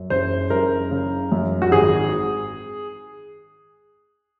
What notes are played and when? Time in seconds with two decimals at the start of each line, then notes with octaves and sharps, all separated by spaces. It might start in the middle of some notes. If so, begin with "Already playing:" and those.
Already playing: F#2
0.10 F#1 C5
0.50 F#1 A#4
0.91 C#3
1.32 F#2
1.62 F#4
1.72 G#1 G#4